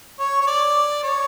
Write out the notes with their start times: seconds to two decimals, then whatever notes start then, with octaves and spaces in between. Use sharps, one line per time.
0.19 C#5
0.41 C#5
0.47 D5
1.03 C#5